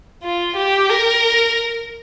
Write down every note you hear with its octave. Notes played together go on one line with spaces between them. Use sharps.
F4
G4
A#4